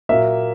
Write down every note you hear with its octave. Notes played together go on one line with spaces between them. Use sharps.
A#2 F#3 A#3 E5